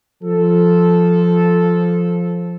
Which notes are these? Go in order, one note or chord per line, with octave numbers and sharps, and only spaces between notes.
F3 A4